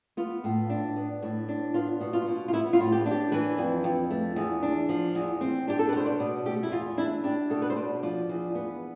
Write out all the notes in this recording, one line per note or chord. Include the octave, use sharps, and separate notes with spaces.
B3 F4
A2
D4
B3
A2
D4
B3 F4
B2
F4
B2
F4
B3 E4
F4
A2
G4
D4
G4
E3 B4
F2
F2
A3
E2
D4
F3
E2
C4
D4 G4
A4
B4
B2 C5
D5
B2
A3 G4
E4
E2 F4
D4 E4
D4 G4
B2 A4
B4
C5
B2 D5
F3 D5
E2
B3